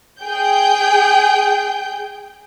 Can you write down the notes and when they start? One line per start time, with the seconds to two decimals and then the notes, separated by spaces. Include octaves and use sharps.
0.22 G#4 G5 G6